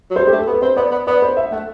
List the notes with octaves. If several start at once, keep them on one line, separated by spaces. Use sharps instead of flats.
F#3
G3 C5
A3 G4
A4
B3
B4
C4 C5
B3 D5
B3
B3 D5
C5
E5
A3 F#5